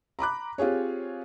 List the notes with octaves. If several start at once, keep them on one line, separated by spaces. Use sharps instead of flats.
A#5 B5 D6 F#6
C4 F4 G4 G#4 C#5